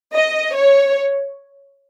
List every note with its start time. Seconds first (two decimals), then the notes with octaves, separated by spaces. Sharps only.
0.14 D#5
0.55 C#5